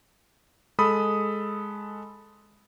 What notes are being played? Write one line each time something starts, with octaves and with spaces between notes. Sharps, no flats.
G#3 A4 B5 D#6